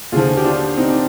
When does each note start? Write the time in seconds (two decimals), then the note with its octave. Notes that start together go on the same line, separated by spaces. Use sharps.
0.12 D#2 D3 F3 F4 G#4
0.37 G4
0.45 D4 F4
0.77 C4 D#4